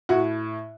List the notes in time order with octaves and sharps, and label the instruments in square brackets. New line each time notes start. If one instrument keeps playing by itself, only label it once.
[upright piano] A2 F#4